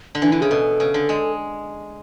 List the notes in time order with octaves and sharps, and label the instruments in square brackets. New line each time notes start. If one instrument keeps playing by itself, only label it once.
[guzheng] D3
[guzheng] E3 [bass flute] D4
[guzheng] D3 [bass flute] E4
[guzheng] C#3 [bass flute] G#4
[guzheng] B2 [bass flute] A4
[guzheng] C#3
D3
G#3